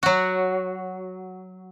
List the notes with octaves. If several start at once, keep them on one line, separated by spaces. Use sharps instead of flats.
F#3 F#4